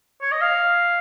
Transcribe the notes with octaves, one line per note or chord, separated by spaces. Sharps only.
C#5
D#5
F5